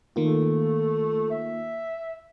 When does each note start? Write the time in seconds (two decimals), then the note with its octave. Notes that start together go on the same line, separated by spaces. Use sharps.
0.16 D#3 A3 A#3 F4
1.30 E5